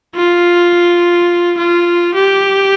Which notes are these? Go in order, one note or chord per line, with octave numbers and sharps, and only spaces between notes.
F4
F4
G4